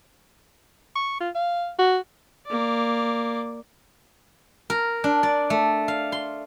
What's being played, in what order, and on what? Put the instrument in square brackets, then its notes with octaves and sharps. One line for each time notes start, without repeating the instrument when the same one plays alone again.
[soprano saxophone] C#6
F4
F5
F#4
[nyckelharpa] A#3 D5
[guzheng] A#4
D4
D5
A3
F5
C6